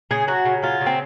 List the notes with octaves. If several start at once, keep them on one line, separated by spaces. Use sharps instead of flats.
C#3 G#4
F#3 F#4
C#3
F#3 F4
C#3
C4